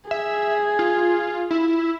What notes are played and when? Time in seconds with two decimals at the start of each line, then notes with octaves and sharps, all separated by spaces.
0.11 G#4 E5
0.79 F4
1.51 E4